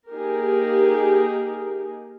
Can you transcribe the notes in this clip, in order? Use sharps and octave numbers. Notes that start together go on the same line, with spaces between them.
A#3 D#4 G4 G#4 A#4